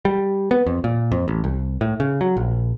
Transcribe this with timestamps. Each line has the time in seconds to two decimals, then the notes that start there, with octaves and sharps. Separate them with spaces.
0.05 G3
0.51 B3
0.67 F2
0.84 A#2
1.12 F2
1.28 A1
1.44 C2
1.81 A2
2.00 C#3
2.21 F#3
2.37 A#1